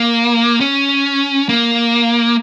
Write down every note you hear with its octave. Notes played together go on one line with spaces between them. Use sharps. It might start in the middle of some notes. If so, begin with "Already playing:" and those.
Already playing: A#3
C#4
A#3